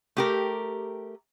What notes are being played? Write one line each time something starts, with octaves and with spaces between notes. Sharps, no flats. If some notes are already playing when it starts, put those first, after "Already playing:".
A3 G4 A#4